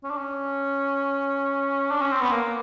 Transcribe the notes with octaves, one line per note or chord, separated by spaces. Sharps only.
C#4
D4
C#4
D4
C#4
C4
B3
A#3